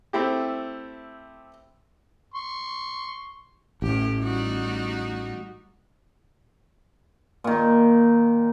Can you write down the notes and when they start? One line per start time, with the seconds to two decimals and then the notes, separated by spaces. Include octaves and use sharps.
0.13 A3 C4 E4 G4
2.34 C6 C#6
3.82 A1 A2 G4
4.21 G3 D#4 F#4
7.44 A#2 D#3